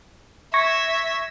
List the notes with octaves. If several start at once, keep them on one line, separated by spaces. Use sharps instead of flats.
E5 C#6 G#6 A#6